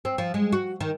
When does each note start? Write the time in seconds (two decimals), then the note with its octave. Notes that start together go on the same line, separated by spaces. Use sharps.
0.05 C4
0.18 F3
0.34 G#3
0.52 F#4
0.81 D#3